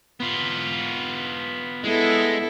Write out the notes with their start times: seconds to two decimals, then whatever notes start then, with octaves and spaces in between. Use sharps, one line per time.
0.20 B3 F4
1.84 G#3 B3 E4 A4